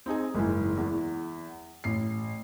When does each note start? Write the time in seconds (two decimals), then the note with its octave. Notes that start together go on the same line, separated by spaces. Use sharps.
0.06 C4 D#4 G#4 G#5
0.35 F#1 G#2 E3
0.77 E2
1.84 A1 C7